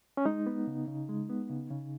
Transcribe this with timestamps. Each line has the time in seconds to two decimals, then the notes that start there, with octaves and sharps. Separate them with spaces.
0.17 C#4
0.25 G#3 D#4
0.46 B3
0.67 C#3
0.88 C#3
1.09 G#3
1.29 B3
1.50 C#3
1.70 C#3